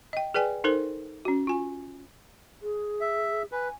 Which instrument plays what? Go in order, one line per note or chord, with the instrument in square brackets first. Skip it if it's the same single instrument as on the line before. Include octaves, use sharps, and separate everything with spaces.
[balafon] D#5 G5
G#4 B4 D5 G5 G#5
D#4 A4 A#4 C5
C#4 F#4
F4 G#5
[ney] G#4
[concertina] E5
[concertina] B4 [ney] G#5